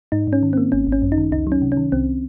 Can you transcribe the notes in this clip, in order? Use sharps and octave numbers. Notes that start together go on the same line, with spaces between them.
G#2 D#4
G#2
C#4
D#3
A#3 C4
G#1 C#4
G#1
C#4
F#2
D#4
D#3
C#2 D#4
F#3 C#4
C3
C#4
D#3
C2 C4